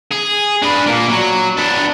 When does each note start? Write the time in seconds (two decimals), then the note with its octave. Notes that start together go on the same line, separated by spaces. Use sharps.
0.12 G#4
0.62 D4 B4
0.86 A#2 A#3
1.09 F#3
1.57 B3 D4